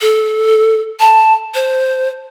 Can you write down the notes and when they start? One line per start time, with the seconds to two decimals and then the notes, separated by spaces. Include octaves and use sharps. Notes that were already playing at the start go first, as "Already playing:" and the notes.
0.01 A4
1.00 A5
1.55 C5